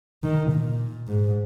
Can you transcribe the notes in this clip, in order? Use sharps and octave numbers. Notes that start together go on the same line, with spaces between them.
D#3
A#2
G#2